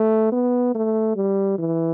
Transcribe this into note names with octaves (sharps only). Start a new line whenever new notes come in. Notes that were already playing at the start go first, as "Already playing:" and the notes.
Already playing: A3
B3
A3
G3
E3